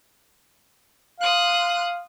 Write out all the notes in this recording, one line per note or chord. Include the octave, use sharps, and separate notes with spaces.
F5 C6 D#6 F#6